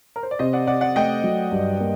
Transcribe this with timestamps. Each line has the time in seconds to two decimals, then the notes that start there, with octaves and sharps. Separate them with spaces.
0.16 A#4
0.23 C5
0.31 D5
0.39 C3 C5 D#5
0.53 D5 F#5
0.67 C3 D5 F#5
0.81 D5 F#5
0.96 A3 D#5 G5
1.24 F#3
1.52 G2
1.80 A#3